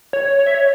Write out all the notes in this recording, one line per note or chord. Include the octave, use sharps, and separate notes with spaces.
C#5
C#5
E5
C#5